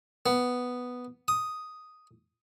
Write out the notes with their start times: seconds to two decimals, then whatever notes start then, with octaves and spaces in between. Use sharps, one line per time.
0.26 B3
1.28 D#6